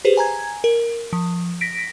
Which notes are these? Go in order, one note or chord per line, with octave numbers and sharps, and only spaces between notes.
G4 G#4 B4 C5
G#5 A#5 G#6
A#4
F3
A#6 B6 D7